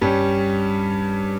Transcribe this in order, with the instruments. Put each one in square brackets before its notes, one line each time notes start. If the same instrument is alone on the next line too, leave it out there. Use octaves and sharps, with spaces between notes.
[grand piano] G2 G3 C#4